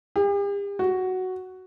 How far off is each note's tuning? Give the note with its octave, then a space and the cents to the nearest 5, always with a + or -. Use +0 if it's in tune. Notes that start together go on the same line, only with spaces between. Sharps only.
G4 +45
F#4 +5